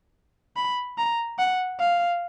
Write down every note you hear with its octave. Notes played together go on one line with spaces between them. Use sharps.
B5
A#5
F#5
F5